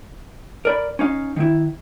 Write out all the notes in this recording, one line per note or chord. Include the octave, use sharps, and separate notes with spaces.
A#4 D5 B5
C#4 D#4 F5
D#3 E4